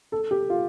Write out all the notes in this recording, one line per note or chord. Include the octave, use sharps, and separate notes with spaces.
A4
G4
F4